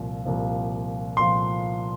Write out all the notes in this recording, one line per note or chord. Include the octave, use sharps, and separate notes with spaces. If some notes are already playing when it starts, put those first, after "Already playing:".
Already playing: C2 A#2 F3
C2 A#2 F3
A#2 F3 C6